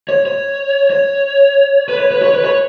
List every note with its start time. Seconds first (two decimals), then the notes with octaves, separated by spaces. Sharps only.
0.09 C#5
0.26 C#5
0.90 C#5
1.89 B4
1.99 C#5
2.11 B4
2.22 C#5
2.34 B4
2.45 C#5